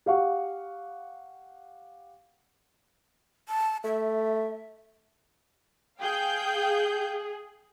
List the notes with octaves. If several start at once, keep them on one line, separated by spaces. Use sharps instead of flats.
G4 F5 F#5 C#6
A5
A3 E5
G#4 F5 G5 G6